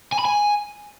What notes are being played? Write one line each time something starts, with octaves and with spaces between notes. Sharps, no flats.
G#5
B5
G#5